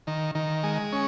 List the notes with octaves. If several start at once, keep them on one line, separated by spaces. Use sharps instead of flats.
D#3
D#3
G#3
C#4